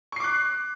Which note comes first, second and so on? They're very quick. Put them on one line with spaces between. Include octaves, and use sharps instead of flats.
C#6 C7 D6 F#6